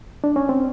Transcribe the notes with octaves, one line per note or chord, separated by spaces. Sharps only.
D4
C#4
C4